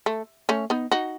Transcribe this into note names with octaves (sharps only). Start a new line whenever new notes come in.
A3
A3 C#4
B3 D#4
D#4 F#4